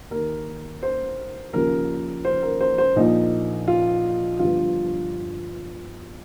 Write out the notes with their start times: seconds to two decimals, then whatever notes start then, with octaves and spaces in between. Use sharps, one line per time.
0.11 D#2 D#3 A#4
0.83 C5
1.53 D#2 C#3 F3 A#4
2.25 C5
2.43 A#4
2.60 C5
2.78 C5
2.96 A#1 A#2 F3 D#4
3.68 F4
4.39 G1 G2 F3 F4